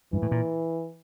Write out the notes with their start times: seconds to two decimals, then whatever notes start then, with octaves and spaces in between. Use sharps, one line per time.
0.13 G2 E3
0.22 A2
0.31 A#2